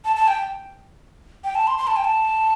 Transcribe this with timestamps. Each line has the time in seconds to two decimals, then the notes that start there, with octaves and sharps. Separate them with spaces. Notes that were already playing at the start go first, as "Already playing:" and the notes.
0.05 A5
0.16 A5
0.28 G5
1.44 G5
1.55 A5
1.67 C6
1.78 C6
1.87 A5
1.97 G5
2.05 A5